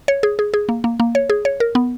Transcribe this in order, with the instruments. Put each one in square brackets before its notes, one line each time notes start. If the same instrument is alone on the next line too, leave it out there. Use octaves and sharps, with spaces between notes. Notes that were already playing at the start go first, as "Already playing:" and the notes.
[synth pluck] C#5
G#4
G#4
G#4
A#3
A#3
A#3
C#5
G#4
C#5
A#4
B3